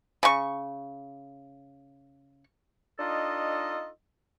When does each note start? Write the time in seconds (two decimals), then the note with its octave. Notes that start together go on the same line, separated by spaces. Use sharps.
0.23 C#3 C#6
2.99 D4 D#4 F4 A4 D#5